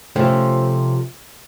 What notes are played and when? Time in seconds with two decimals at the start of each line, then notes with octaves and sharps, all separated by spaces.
0.16 C3 F3 A3 C#4